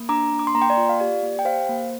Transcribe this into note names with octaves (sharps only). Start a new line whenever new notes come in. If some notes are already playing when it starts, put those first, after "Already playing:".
Already playing: A#3
D4 A#5 D6
A#3
D6
C6
A#3 A#5
G5 C6
D5
F4
F5
G4 D5
A#3
G5
G4 C5 F5
A#3